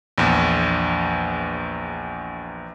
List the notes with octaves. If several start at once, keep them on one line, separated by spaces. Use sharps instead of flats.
A#1 E2